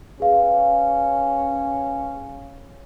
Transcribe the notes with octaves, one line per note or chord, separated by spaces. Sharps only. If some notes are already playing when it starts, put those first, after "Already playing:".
C#4 G#4 B4 F5